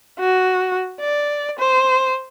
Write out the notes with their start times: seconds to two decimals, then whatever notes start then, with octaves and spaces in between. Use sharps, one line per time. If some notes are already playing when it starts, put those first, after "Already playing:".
0.19 F#4
1.00 D5
1.59 C5